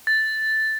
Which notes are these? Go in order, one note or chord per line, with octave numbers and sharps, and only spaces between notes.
A6